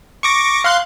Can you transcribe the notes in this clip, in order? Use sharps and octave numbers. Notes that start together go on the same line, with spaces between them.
C#6 D6 A#6
F5 C6 F#6